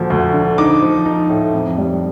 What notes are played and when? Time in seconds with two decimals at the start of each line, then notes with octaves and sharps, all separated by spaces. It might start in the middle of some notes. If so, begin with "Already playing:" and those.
Already playing: D2 A#2 F3
0.10 D2
0.33 D3
0.58 D#4 D6
0.82 F3
1.06 D#4
1.30 A2
1.53 F2
1.78 G3